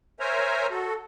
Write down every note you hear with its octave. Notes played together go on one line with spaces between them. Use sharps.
A#4 C5 C#5 E5 G#5 A#5
F#4 A4